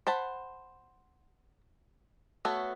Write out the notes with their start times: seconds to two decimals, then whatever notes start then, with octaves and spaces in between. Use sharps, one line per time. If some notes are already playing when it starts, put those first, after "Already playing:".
0.07 C5 F#5 A5 B5
2.45 A3 B3 F#4 A4 C#5